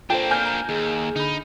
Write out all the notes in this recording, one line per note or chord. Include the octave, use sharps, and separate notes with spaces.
A#3 D4 F4 A4 C5 G5
G#5 F6 G6
A#5
D#2 G#4
D3 D#4 B5